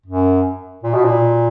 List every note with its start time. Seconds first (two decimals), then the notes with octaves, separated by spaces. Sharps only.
0.06 F#2
0.83 A#2
0.94 B2
1.05 A#2